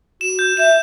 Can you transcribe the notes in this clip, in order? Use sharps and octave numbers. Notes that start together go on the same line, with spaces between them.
F#4 E7
G6
E5 G6 E7